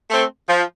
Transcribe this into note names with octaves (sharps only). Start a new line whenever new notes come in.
A3 C4
F3